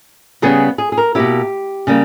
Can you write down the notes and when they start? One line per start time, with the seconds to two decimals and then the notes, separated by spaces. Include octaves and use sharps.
0.42 C#3 G3 B3 G#4
0.78 G#4
0.92 G#4
0.98 A#4
1.15 B2 A#3 E4 G4
1.87 C#3 G3 A#3